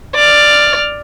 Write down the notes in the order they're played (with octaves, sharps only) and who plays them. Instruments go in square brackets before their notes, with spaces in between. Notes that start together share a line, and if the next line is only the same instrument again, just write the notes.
[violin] D5 F6